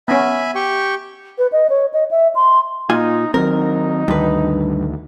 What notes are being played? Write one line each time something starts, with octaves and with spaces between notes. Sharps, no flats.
B3 C#4 E5 G#5 B5
G4 G5 C#6
B4
D#5
C#5
D#5
E5
C6
A#2 D#4 F4 G#5
D#3 F#3 C4 D#4 A#4
D2 G2 D#3 B4